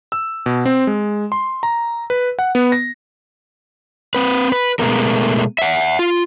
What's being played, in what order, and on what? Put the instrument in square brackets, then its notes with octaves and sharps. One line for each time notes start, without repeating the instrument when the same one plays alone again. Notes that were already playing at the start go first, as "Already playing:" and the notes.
[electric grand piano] E6
B2
C4
G#3
C6
A#5
B4
F#5
B3
A#6
[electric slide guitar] C4 B4
B4
B2 G#3 A3 B3 A#4
E5 F#5
F4